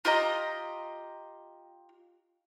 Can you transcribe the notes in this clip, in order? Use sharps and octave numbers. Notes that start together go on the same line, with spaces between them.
F4 G4 D#5 A#5